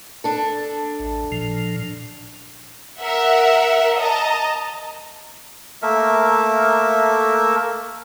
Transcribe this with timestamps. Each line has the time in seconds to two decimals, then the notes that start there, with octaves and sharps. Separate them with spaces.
0.24 D4 A4
0.99 A1
1.32 A#2 F3
3.01 A#4 E5 F#5
3.98 D#5 A5 A#5
5.82 A3 A#3 A#4 E5